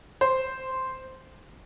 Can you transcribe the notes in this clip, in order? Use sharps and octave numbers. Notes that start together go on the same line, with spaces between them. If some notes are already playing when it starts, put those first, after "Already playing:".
C5